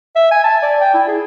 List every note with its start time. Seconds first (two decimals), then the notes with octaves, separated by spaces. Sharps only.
0.16 E5
0.31 G#5
0.44 A5
0.62 D5
0.81 G5
0.94 E4
1.08 G#4